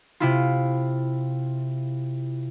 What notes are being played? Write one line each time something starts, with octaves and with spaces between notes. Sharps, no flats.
C3 E4 F4